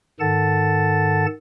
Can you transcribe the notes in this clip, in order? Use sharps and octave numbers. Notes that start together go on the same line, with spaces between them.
G#2 D#3 A4 F#5 A5 A6